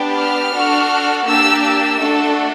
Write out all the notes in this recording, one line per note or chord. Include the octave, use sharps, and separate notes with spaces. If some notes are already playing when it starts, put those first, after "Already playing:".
Already playing: B3 D4 G4
F6
D4 F#4 A4
A#3 D4 G4 E6
E6
A3 D4 F#4 A4